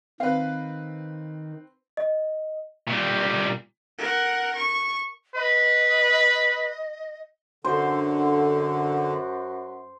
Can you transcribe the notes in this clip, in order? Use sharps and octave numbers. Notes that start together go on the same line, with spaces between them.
D#3 C4 B4 F5
D#5
A#2 G3
A#4 F#5
C#6
B4 D#5
F#2 D3 C5